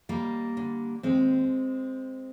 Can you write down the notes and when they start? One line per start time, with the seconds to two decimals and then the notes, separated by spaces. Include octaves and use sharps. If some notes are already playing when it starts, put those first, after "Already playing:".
0.09 D#2 G3 A#3
0.57 D3
1.03 D#2 G#3 C4